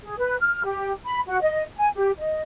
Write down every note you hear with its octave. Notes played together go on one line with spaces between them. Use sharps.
G#4
B4
F6
G4
B5
F#4
D#5
G#5
G4
D#5